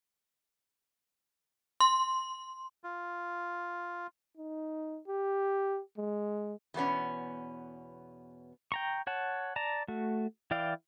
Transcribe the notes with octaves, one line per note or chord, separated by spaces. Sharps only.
C6
F4
D#4
G4
G#3
E2 B2 B3 C#4
G5 A#5 C#6
C#5 F#5 A5
D5 A5 A#5
A3 F#4
E3 E4 D5 F5 G5